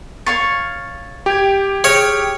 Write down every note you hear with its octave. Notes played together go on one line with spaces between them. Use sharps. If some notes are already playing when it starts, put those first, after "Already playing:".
C#5 F5 C#6 A6
G4 G5 G#6
G#4 C#5 G5 F6